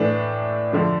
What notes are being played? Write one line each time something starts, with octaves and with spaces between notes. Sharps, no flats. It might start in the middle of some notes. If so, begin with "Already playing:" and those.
Already playing: A2 E3 A3 D4
D3 F3 A3 D4